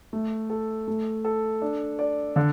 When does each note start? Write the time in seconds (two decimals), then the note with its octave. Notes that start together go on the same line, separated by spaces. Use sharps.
0.13 A3
0.50 A4
0.88 A3
1.25 A4
1.62 D4
1.99 D5
2.36 D3